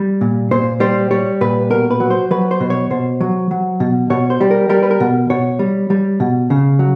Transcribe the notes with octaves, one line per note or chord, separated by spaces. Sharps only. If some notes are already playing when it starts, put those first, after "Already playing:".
Already playing: G3
A#2
A#2 C5
G3 C5
G3 C#5
A#2 B4
B2 A#4
B4
F#3
C5
F#3 B4
C5
B2
C#5
B2 C5
F#3
F#3
B2
B2 C#5
C5
G3
A#4
G3 A#4
B4
A#4
B2
B2 C#5
G3
G3
B2
C#3
F#3